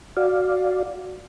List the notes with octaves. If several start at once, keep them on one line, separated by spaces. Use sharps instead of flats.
F#4 D5 F5